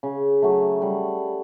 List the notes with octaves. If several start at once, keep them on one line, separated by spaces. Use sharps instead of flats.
C#3
F#3 A3
G3